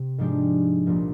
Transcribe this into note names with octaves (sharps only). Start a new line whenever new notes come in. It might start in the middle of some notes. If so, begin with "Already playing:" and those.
Already playing: C3
G#2 F3 G#3 D4 G4
C2 A#2 F3 A#3 D#4